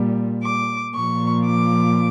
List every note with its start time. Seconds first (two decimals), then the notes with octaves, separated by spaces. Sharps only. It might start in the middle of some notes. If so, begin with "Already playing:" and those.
Already playing: A#2 G3
0.44 D6
0.94 A#2 F3 C#6
1.45 D6